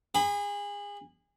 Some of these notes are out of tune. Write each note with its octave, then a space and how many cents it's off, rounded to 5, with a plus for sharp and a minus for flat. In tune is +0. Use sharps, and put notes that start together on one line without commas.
G#4 -30 B5 +0